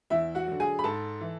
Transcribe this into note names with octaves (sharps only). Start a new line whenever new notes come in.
E2 E4 E5
F#4 F#5
D3 F#3
G#4 G#5
B5
G#2 A4 A5
E3